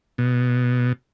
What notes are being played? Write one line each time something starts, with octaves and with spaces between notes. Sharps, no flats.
B2